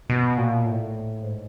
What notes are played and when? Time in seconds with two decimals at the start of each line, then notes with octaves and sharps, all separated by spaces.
0.10 B2
0.37 A#2
0.65 A2
1.23 G#2